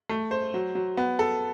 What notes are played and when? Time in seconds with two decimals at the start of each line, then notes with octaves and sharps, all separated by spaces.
0.09 A3
0.31 C5
0.54 F#3
0.75 F#3
0.97 B3
1.19 A4